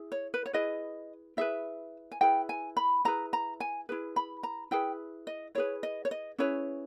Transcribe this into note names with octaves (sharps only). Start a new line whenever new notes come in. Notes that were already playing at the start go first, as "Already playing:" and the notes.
Already playing: E4 G#4
C#5
B4
C#5
E4 G#4 B4 D#5
E4 G#4 B4 E5
G#5
E4 G#4 B4 G5
G#5
B5
E4 G#4 B4 A#5
A#5
G#5
E4 G#4 B4
B5
A#5
E4 G#4 B4 G5
D#5
E4 G#4 B4 C#5
D#5
C#5
D#5
C#4 E4 G#4 B4 C#5